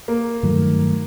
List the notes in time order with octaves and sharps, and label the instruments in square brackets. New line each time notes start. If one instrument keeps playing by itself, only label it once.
[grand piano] A#3
[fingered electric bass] G2 D#3 F#3 A3